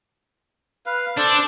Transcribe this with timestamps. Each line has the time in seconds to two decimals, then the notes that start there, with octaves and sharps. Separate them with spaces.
0.86 B4 F5
1.18 D4 A4 C5 D5